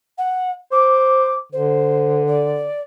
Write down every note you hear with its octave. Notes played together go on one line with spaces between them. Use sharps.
F#5
C5 D6
D3 C5
D5